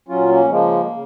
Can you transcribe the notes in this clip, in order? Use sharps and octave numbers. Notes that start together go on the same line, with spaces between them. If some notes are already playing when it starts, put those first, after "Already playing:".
A#2 F#3 C#4 F4
A#3 C#4
C#3 F3 G#3 A#3
C#3